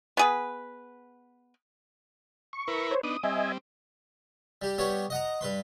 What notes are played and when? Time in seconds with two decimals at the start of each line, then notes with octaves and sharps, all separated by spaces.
0.17 B3 G#4 B4
2.53 C#6
2.68 E4 A#4 B4
2.91 C5 C#5
3.03 B3 D4 D#4 D#6
3.23 G3 C4 D#5 E5 G#5
4.62 G3 G4
4.78 G3 B3 G4 C#5
5.10 D#5 F#5 A#5
5.41 G2 B4 C6